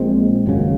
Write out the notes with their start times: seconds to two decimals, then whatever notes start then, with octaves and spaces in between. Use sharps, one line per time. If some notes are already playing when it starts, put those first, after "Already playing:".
Already playing: A#1 A#2 G#3 C4
0.46 G#1 F#2 C#3